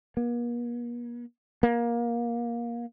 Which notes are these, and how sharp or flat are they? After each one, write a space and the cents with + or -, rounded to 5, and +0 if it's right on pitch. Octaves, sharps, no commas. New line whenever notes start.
A#3 +45
A#3 +20